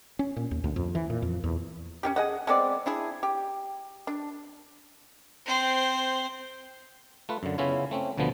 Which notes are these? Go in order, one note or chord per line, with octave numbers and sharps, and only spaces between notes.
C#4
A#2
D#2
D2
F2
E3
A#2
F2
E2
C#4 F4 G4
G#4 D#5 F#5
G#3 B3 C4 D5
D4 E4 G#4
G4
D4
C4 C5
A3 F4 B4
F#2 D3
C#3 B3 C#4 E4 F4 C#5
A3 C4 C#4
D2 B2 D3 F3 B3